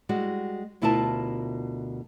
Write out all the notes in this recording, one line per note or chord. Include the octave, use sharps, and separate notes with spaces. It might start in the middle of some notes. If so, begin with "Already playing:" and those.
G3 G#3 F#4
D2 B2 E4 F4 A#4 A5